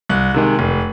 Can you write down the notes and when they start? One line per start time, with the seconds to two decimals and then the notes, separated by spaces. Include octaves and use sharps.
0.09 C2 F#6
0.34 C3 D#3 G#3
0.59 F1